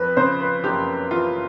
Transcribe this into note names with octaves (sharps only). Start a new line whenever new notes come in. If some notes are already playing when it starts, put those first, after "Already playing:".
Already playing: F2 B4
C#3 C5
B4
F#1 G4
E3 F4